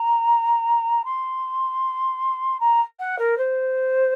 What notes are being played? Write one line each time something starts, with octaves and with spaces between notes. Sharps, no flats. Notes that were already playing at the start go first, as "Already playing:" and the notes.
Already playing: A#5
C6
A#5
F#5
A#4
C5